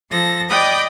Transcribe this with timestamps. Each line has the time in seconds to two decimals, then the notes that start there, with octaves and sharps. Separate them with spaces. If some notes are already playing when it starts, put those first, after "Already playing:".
0.10 F3 A4 A#6
0.48 D5 D#5 G5 B5 D#6